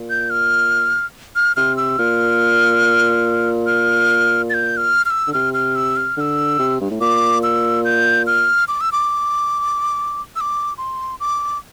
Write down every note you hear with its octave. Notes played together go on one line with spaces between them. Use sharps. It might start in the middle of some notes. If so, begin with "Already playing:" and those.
Already playing: A#2
G6
F6
F6
C3 F6
E6
A#2 F6
F6
A6
G6
F6
F6
E6
D3
C3 F6
F6
E6
F6
D3 E6 F6
C3
G2
A2
A#2 D6
E6
G6
F6
D6
E6
D6
E6
D6
C6
D6